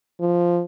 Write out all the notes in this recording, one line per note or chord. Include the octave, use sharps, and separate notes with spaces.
F3